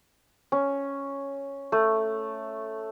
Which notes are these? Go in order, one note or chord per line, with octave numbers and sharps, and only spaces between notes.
C#4
A3